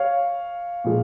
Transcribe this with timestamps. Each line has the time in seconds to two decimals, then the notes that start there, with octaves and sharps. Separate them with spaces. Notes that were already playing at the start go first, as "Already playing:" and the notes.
Already playing: C#5 F5
0.84 A#2 F3 G#3